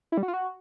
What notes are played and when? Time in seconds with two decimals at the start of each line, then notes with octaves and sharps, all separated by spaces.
0.12 E4
0.17 G3
0.23 F#4
0.28 F4
0.33 F#4